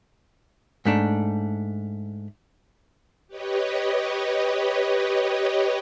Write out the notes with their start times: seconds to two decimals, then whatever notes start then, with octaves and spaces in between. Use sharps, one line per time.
0.85 G#2 A3 D4
3.27 G4 B4 C#5 D#5